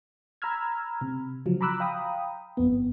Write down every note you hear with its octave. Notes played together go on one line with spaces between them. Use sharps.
A#5 B5 E6 F6 G#6
C3
C#3 F3 F#3
A#5 B5 D6 E6 F#6
F5 G5 A#5 B5 D#6
G1 F2 B3